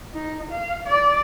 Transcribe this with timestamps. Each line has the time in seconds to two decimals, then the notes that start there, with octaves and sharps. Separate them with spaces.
0.14 D#4
0.51 F5
0.87 D5